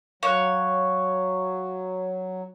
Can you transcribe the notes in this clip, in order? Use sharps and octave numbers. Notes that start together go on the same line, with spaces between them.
F#3 C#5 F5 F#6